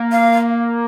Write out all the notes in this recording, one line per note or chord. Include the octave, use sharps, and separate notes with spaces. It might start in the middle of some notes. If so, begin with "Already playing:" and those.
Already playing: A#3
F5